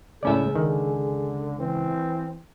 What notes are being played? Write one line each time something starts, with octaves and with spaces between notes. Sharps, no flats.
C#2 A2 B3 C#4 G#4 D5 E5
D3 D#3
E3 C4